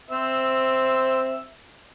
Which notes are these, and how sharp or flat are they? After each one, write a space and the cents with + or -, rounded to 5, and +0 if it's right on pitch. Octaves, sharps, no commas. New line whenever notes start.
C4 +0 C5 +0 E5 +0